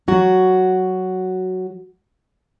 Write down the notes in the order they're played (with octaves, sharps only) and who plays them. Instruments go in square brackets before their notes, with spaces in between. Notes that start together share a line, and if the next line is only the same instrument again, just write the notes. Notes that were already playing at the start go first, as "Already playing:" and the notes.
[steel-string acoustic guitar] F#3 F#4